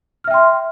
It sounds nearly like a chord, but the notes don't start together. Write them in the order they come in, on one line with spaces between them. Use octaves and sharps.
F6 E5 G5 C6